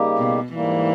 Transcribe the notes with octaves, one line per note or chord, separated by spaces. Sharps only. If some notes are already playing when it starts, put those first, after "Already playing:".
Already playing: C#3 G3 A#3 D#4 G4
B2
G#2 E3 G3 A#3